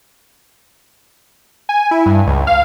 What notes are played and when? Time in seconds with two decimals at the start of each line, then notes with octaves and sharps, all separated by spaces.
1.69 G#5
1.91 E4
2.06 G2
2.27 C#2
2.47 F5